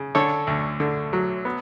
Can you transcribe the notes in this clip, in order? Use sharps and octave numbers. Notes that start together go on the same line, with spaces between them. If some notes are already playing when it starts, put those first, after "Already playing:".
Already playing: C#3
D3 A4 C#5
D2
D3
F#3
B3